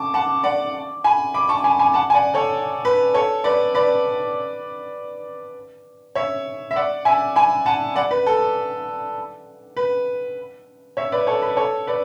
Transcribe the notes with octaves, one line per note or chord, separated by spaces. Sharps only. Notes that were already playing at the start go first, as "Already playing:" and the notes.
Already playing: A5 C#6 D6
F#5 A5
D5 F#5
G#5 B5
B5 D6
A5 C#6
G#5 B5
G#5 B5
F#5 A5
G#5
D5 F#5
A4 C#5
B4
A4 C#5
B4 D5
B4 D5
C#5 E5
E5
D5 F#5
E5 G#5
G#5 B5
F#5 A5
D5 F#5
B4
A4
B4
C#5 E5
B4 D5
A4 C#5
B4
A4 C#5
B4 D5